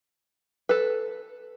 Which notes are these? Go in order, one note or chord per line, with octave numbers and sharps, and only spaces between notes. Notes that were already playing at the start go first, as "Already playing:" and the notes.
A4 B4